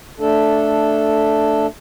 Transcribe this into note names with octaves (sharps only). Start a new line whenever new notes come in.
A3 D4 A4